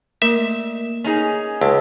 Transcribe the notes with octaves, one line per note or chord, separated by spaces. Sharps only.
A3 A#3 A#4 E5
C#4 D#4 G#4
C#2 A5 E6